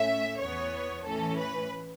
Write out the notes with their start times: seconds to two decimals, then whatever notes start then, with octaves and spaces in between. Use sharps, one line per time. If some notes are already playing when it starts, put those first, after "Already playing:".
Already playing: A2 A3 C#4 E5
0.39 E2 E3 B3 C#5
1.05 A2 E3 C#4 A4
1.39 B4